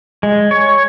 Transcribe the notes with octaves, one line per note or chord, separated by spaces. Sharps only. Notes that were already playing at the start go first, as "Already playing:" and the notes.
G#3
C#5